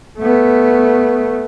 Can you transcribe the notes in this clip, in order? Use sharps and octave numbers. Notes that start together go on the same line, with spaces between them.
A3 B3